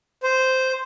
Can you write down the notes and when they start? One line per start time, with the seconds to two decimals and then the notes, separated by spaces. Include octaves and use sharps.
0.23 C5